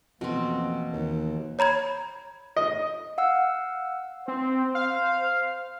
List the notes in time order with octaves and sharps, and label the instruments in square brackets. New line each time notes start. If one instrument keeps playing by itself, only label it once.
[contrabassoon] F2 [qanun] B2 C4 [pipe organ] E3 A#3
[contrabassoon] D#2
[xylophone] C#5 A#5 B5 G#6
[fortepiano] D#5
[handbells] F5 F#5 E6
[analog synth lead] C4 [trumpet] C5
[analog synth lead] F5